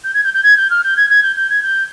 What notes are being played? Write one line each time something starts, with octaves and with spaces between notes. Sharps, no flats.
G6
G#6
G6
G6
G#6
G6
F6
G6
G#6
G#6
G6
G6
G#6
G6